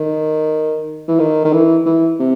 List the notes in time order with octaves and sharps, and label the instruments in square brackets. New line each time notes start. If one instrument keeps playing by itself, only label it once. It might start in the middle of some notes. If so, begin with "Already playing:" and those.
Already playing: [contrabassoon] D#3
E3
D#3
D#3
E3
E3
C3